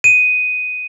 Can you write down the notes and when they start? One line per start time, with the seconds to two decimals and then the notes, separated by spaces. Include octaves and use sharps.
0.04 D#7